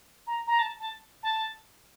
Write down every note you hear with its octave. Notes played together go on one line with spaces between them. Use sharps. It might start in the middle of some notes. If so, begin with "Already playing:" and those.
A#5
A#5
A5
A5
A5